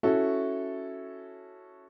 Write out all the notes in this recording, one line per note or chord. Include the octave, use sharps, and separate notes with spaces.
C#4 E4 F#4 A4